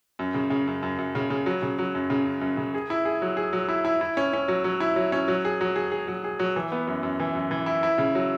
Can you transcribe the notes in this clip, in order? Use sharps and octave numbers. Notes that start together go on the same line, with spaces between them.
F#2
C#3
C#3
F#2
F#2
F#2
C#3
C#3
F#3
C#3
F#3
F#2
C#3
F#2
F#2
C#3
G#4
E4
G#4
F#3
G#4
F#3
E4
E4
E4
C#4
C#4
F#3
F#3
E4
F#3
C#4
F#3
G#4
F#3
G#4
G#4
F#3
G#4
F#3
E3
B3
F#2
F#2
E3
F#2
E3
E4
E4
C#3
F#3